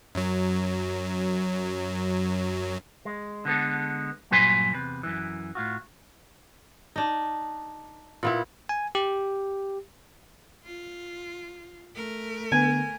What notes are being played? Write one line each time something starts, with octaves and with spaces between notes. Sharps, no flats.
F#2 F#3
G#3
D3 G#3 B3 A4
G2 A#2 F#3 B4 G#5 C6
E2 C3 B4
F#2 E3
A2 F4 F#4
D4 D#4
A#2 B3 E4
G#5
G4
F4
A3 A#4
D3 B3 G#5